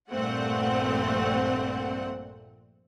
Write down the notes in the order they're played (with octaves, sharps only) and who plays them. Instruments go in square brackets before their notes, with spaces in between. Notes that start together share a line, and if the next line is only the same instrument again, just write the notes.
[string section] A#1 G2 A#2 A3 C4 F#5